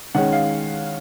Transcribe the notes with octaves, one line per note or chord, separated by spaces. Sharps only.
D#3 G#3 C#4 F#5
F5